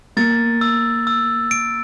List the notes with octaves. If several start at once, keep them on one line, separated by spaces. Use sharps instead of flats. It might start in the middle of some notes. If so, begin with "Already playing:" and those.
A#3 A6
E6
E6
D7